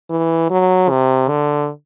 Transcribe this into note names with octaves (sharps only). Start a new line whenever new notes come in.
E3
F#3
C3
D3